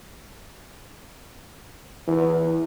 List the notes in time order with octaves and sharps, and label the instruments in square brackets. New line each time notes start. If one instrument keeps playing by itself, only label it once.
[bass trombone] E3